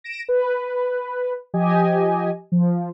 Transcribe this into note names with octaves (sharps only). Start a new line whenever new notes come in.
A#6 D7 E7
B4
F3 G4 D#5 G#5
F3